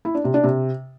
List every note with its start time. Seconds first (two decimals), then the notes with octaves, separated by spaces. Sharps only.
0.05 E4
0.15 D4
0.24 C3
0.34 D4
0.44 C3